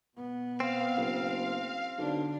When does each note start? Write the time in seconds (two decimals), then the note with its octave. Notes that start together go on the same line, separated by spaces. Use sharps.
0.17 B2 B3
0.60 C4 F5
0.97 F#1
1.98 B1 D3 D4